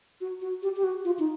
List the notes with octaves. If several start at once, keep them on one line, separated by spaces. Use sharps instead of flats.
F#4
F#4
G4
G4
F#4
F4
D#4